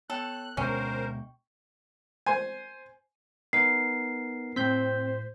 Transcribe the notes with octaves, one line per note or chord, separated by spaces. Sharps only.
B3 A4 C#5 G5 F#6
D2 B2 G#3 C#4 A#4 C5 G5 C#6
C5 G#5
B3 D#4 A#4 C7
A2 C4 C5 G6 B6